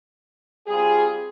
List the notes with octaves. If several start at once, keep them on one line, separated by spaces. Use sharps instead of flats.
G3 C4 F4 G#4